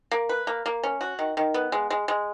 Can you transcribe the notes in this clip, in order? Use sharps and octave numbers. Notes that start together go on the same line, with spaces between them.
A#3
B4
A#3
A#3
C#4
F#4
D#3
D#3
B3
G#3
G#3
G#3